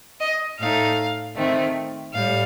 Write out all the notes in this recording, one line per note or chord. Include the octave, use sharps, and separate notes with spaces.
D#5
A2 A3 D#4 F5
D#3 A3 C4
A2 G3 F5